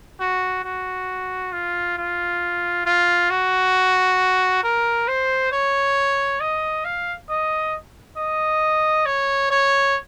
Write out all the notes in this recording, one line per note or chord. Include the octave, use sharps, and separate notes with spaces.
F#4
F#4
F4
F4
F4
F#4
A#4
C5
C#5
D#5
F5
D#5
D#5
C#5
C#5